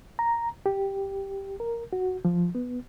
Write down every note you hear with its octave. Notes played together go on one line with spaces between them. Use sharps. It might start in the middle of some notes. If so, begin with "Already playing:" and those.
A#5
G4
A#4
F#4
F3
B3